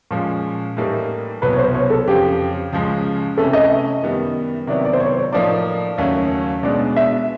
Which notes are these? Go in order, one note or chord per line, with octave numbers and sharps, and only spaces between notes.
A#2 F3 G#3 C#4
A2 E3 G3 A#3 D#4
C2 B2 F#3 B3 B4
C#5
C5
C#5
A4
F2 C#3 F3 G4
C#2 C#3 F3 G#3 C#4
C3 E3 A3 C#4 A4
D#5
E5
F#2 D#3 G3 B3
C3 D#3 F#3 B3 E4 D5
D5
C5
C#5
C#5
A2 F3 A#3 D#4 D5
D#2 C#3 F#3 A3 C#4
B2 G#3 B3 D4 D5
E5